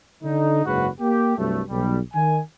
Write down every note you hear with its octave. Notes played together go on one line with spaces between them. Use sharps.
D3 D#4
F#1 G#2 C#3 F#4 B4 F#5
A#3 G4
C2 G2 F#3 A3
B1 G3
D#3 G#5